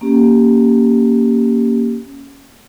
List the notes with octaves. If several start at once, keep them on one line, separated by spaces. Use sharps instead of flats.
A#3 C#4 G4